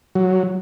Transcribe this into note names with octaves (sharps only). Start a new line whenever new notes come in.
F#3